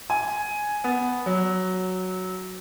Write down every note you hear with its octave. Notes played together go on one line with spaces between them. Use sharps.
G#5
B3
F#3